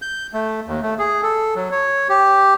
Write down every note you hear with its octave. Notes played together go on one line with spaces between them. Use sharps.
G6
A3
D#2
A3
G#4
A4
F#3
C#5
G4